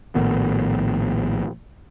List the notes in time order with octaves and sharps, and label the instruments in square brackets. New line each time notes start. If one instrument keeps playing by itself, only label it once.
[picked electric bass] A#1 A2 D#3 B3